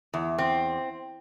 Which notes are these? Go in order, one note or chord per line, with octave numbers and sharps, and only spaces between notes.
E2
C4